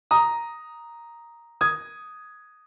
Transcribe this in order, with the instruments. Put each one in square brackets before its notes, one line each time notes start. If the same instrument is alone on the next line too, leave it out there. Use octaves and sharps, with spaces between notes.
[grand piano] A#5 D#6
D#6 G#6